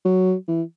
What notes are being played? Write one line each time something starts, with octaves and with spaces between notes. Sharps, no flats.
F#3
E3